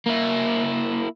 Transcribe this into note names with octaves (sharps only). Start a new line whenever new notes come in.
A#3 E4